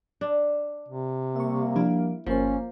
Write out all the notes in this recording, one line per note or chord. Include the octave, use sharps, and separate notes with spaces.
D4
C3
G3 A#3 E5 C#6
F3 D4 E4
G1 F3 A#3 C#4 C5